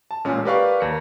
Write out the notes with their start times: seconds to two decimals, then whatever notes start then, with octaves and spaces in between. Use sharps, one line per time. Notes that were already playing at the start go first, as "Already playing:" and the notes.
0.11 A5
0.24 A1 A#2 G#3 C#4
0.45 G4 A#4 B4 D5 F5 C#6
0.80 D#2 A#4 C#7